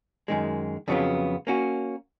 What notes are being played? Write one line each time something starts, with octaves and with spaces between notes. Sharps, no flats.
F#2 D#3 G#3
F2 C#3 F#3 B3 F4
A#3 C#4 F#4